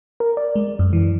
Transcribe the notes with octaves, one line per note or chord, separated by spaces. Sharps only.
A#4
D5
G#3
F#2
E3